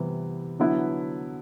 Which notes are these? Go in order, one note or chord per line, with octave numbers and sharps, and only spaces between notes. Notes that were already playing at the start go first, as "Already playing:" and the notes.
Already playing: C3 E3 G3 B3
D3 F#3 B3 E4 B4